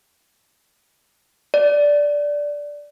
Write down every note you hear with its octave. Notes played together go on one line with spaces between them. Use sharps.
D5